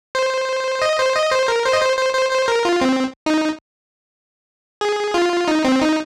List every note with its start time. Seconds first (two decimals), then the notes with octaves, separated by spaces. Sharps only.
0.15 C5
0.82 D#5
0.98 C5
1.15 D#5
1.31 C5
1.48 A#4
1.65 C5
1.73 D#5
1.82 C5
1.98 C5
2.14 C5
2.31 C5
2.48 A#4
2.65 F4
2.81 C4
3.26 D#4
4.81 G#4
5.14 F4
5.48 D#4
5.64 C4
5.81 D#4